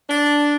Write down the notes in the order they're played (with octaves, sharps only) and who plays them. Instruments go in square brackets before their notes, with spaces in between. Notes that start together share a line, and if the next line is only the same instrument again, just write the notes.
[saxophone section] D4